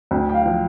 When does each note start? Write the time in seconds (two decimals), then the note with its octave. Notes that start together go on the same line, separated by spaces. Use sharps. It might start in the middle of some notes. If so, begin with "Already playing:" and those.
0.11 D2 G5
0.29 G5
0.34 F5
0.46 F3